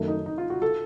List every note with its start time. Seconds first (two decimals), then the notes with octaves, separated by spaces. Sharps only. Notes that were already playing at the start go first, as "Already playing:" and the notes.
Already playing: F#2 D#3 A3
0.08 D#4
0.26 D#4
0.38 F4
0.50 F#4
0.62 A4